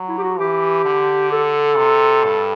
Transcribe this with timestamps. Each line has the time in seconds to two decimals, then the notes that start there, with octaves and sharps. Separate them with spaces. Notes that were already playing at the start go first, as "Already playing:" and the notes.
Already playing: F#3
0.09 E4
0.18 G4
0.24 F#4
0.39 E3 G4
0.85 D3
1.32 A4
1.77 C3
2.24 G2